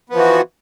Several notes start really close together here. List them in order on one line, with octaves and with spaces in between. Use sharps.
B3 F3 E3 F#4